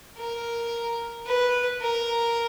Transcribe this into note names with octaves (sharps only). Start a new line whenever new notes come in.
A#4
B4
A#4